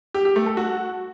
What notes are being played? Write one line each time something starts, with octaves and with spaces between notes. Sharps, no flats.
G4
G4
A3
A4
F#4